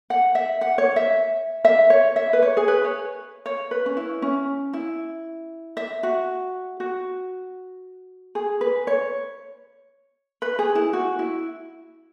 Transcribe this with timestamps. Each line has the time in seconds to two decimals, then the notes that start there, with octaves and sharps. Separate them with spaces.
0.10 F#5
0.35 E5
0.61 F#5
0.78 C#5
0.96 E5
1.65 E5
1.90 C#5
2.16 E5
2.33 B4
2.42 C#5
2.57 G#4
2.68 B4
2.85 C#5
3.46 C#5
3.71 B4
3.86 C#4
3.97 E4
4.22 C#4
4.73 E4
5.77 E5
6.03 F#4
6.80 F#4
8.35 G#4
8.61 B4
8.87 C#5
10.42 B4
10.59 G#4
10.75 E4
10.93 F#4
11.19 E4